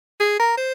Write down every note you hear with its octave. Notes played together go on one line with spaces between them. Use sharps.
G#4
A#4
C5